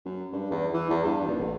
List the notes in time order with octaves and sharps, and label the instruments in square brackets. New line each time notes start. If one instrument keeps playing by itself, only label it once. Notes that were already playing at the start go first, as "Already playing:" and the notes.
[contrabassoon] F#2
G2
E2
E3
E2
G2
D#1
A1